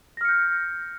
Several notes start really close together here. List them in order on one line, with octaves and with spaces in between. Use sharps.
A#6 F6 C#7 G6